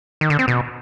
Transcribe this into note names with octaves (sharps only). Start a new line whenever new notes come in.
D#3
D3
C4
B2